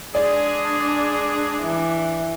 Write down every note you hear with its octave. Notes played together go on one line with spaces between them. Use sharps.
G#3 D4 G#4 D5
E3